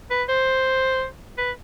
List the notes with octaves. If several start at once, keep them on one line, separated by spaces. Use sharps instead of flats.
B4
C5
B4